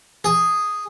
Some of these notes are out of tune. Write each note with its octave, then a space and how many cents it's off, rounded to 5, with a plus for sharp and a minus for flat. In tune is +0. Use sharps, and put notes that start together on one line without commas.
G#4 -5